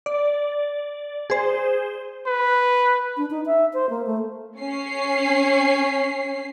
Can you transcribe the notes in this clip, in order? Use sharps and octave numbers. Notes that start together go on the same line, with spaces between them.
D5
G#4 C5
B4
D4
D#4
E5
C5
A#3
A3
C#4 C7